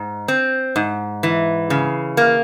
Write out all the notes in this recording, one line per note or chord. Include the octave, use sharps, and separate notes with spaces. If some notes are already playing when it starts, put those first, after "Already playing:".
Already playing: G#2
C4
G#2
E3
C#3
A#3